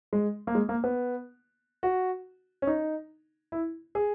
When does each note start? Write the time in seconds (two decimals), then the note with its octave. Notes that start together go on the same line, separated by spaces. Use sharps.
0.13 G#3
0.47 A#3
0.55 G#3
0.69 A#3
0.84 B3
1.83 F#4
2.62 C#4
2.67 D#4
3.52 E4
3.95 G#4